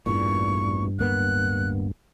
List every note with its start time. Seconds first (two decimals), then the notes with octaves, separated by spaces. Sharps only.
0.06 A1 E2 G2 A#2 C#6
0.99 D1 A#3 B3 F#6